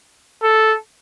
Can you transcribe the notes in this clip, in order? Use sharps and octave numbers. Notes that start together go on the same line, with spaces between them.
A4